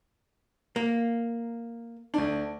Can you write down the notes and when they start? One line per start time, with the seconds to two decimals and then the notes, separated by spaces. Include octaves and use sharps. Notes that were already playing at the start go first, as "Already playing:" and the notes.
0.76 A#3
2.14 D2 D4